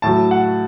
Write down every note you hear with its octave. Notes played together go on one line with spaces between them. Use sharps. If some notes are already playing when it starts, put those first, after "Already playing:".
A2 F#3 A5
F#5